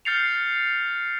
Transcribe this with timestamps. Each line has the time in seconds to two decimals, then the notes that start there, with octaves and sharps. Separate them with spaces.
0.05 F6 G6 A6 C7 C#7 F7